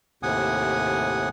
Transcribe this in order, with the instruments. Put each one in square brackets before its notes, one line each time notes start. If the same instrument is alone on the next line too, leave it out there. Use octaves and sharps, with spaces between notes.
[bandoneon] D#2 A2 C3 F#5 G#5 D#6